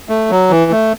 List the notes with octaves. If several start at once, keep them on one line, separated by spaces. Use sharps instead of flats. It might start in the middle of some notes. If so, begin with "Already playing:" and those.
A3
F#3
E3
A3